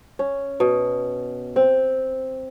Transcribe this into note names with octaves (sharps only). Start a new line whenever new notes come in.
C#4
B2
C4